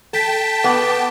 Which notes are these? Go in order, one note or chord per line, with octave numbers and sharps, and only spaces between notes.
A4 G5 A5 B6
B3 D6